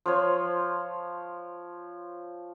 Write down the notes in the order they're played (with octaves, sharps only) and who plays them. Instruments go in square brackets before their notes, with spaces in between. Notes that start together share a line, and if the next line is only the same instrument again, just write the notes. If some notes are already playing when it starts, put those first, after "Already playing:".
[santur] F3 C5 C#5